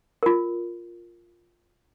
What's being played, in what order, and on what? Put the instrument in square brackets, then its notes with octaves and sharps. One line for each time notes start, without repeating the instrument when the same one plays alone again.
[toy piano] F4 A#4